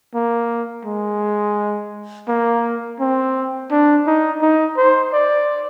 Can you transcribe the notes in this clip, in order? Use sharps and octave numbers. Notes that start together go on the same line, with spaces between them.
A#3
G#3
A#3
C4
D4
D#4
D#4
C5
D5